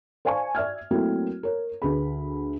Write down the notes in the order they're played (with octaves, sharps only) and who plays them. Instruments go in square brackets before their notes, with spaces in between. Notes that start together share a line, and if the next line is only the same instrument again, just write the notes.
[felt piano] C5 D5 F5 G#5 A5 C#6
D5 E5 F6 G#6
F#3 A3 A#3 C4 E4 F#4
A#4 C#5
D2 G#4 B4 B5